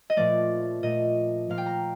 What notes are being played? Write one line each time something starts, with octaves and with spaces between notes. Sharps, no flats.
D#5
A#2 F3 A3 D5
A#2 A3 D#5
A#2 F3 A#3 F5
G5
A#5